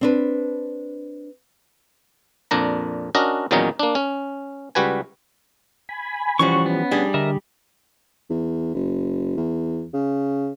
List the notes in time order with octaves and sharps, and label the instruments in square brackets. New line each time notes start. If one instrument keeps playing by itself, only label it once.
[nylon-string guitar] C4 D4 B4
[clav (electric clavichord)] F2 A#2 D4 A#5
C#4 D4 F#4 A#4 D#5
E2 A#2 D#3 F#3 C#4 D#4
A#3 D4
C#4
C#2 G3 F#4 B4 G#5
[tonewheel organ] G#5 B5
[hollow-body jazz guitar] E3 F3 G3 [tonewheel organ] C#4 [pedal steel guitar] F#4 C#6
[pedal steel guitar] B3
[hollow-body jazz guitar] G3 D4 G#4
[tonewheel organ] D3 [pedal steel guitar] A#4 D#5 E5
[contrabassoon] E2
F#1
E2
C#3